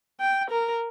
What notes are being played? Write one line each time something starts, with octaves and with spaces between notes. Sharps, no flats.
G5
A#4